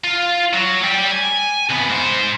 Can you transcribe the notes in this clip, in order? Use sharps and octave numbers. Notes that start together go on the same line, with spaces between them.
F4
F#3
G3 G4
G#5
C2 B3
G#2 C5